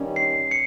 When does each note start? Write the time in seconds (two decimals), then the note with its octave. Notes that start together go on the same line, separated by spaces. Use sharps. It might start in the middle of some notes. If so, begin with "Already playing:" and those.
Already playing: G2 D#3 G3 C#4
0.16 C7
0.51 C#7